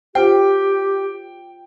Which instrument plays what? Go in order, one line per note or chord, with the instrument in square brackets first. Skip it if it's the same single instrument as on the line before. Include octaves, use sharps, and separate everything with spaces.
[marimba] F4 C5 [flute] G4 [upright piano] G5